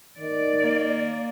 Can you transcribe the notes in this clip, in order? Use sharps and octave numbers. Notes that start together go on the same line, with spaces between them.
D#3 D5
A#3